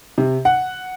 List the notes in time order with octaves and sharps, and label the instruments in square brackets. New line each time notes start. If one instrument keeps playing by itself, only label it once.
[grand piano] C3
F#5